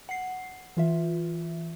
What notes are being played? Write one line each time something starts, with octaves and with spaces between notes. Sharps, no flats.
F#5 C7
E3 F4 E5